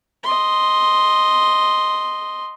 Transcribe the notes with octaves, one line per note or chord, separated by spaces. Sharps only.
D#5 C6